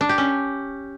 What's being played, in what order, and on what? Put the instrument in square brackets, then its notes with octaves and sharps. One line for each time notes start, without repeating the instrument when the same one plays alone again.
[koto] D4
G4
C#4